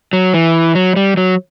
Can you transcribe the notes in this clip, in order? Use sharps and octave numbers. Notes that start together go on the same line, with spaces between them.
F#3
E3
F#3
G3
F#3